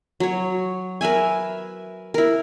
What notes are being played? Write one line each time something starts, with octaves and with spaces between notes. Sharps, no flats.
F#3 C#5
A#4 B4 E5 G#5
E4 A#4